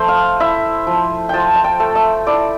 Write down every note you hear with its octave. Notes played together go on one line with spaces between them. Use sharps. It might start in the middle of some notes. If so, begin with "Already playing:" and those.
Already playing: F3 A3 C5
F5
E4 E5
F3
F3 G5 A5
A5
G5
A3
E5
E4 D5